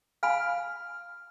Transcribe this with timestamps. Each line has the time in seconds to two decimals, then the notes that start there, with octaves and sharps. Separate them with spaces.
0.23 F5 G#5 B5 F6